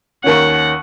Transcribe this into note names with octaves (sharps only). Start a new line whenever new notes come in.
D#2 D#3 C#4 F#5